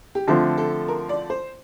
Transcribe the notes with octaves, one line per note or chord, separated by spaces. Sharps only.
G4
D3 F3 A3 C4 A4
A4
A#4
D5
C5